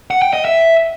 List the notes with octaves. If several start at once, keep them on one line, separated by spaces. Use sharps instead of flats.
F#5
G5
D#5
E5